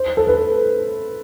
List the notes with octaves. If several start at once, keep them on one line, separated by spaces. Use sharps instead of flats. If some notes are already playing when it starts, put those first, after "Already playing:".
Already playing: C5
A4
B4